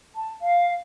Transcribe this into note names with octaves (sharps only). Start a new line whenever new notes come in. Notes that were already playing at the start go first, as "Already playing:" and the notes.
A5
F5